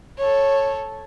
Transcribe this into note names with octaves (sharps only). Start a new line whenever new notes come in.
A4 C#5